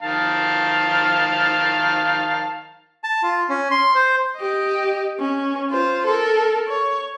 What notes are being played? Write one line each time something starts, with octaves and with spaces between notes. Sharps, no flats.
D#3 F5 A5
A5
F4
C#4
C6
C5
G4 D#5
C#4
F4 C5
A4 A#4
C#5